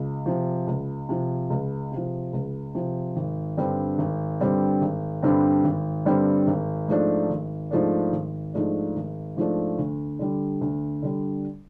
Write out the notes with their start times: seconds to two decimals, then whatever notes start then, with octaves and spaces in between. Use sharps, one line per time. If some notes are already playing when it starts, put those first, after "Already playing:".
Already playing: C#2
0.26 C3 F3
0.67 C#2
1.09 C3 F3
1.50 C#2
1.92 C3 F3
2.33 C#2
2.75 C3 F3
3.16 G#1
3.57 G2 D3 G3 C4
3.98 G#1
4.40 G2 D3 G3 C4
4.81 G#1
5.22 G2 D3 G3 C4
5.64 G#1
6.05 G2 D3 G3 C4
6.47 G#1
6.89 G#2 F3 A3 D4
7.30 G#1
7.71 G#2 F3 A3 D4
8.12 G#1
8.54 G#2 F3 A3 D4
8.96 G#1
9.36 G#2 F3 A3 D4
9.78 D2
10.19 D3 G3
10.61 D2
11.02 D3 G3